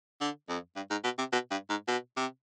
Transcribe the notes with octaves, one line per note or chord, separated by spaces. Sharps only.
D3
F2
G2
G#2
B2
C3
B2
G2
G#2
B2
C3